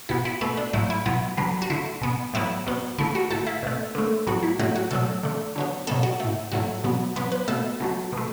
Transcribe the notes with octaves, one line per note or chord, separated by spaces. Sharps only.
B2 B3 E4
E4
B2 A3 B4
D4
A2 F#3 A3 E4
E4
B2 F#3 B3 E4
D3 F#3 B3
F#4
D3 A3 E4
B2 B3
A2 F#3 B3 E4
B2 F#3 B3
D3 A3 E4
F#4
A2 A3 A4
E4
B2 A3
D3 A3
A2 F#3 B3 F#4
E4
A2 F#3 A3 F#4
F#4
B2 F#3 A3 A4
D3 A3
D3 F#3 B3
B2 F#3 B3 A4
F#4
A2 A3
A2 F#3 A3 F#4
B2 F#3 B3
B2 F#3 B3 B4
B4
B2 A3 A4
B2 F#3 A3
B2 A3